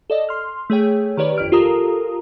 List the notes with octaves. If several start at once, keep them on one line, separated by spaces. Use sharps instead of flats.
A4 D5 D#5
C6 F6
A3 G#4 C#5 G5
D#3 G4 B4 C#5 D5
G1 F2 F6 D7
F4 G4 A4 A#4 A#5 D#6